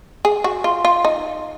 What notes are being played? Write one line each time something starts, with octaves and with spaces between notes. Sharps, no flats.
G#4
F#4
F4
F4
D#4